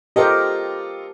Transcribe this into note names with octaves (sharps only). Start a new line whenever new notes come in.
F4 G4 A4 A#4 C5 D#5